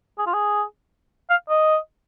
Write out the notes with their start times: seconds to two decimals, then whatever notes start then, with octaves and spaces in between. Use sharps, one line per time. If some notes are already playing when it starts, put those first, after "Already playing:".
0.19 G#4
0.27 F4
0.34 G#4
1.30 F5
1.49 D#5